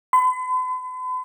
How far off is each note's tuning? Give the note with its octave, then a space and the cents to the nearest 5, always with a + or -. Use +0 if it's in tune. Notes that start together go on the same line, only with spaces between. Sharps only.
B5 +45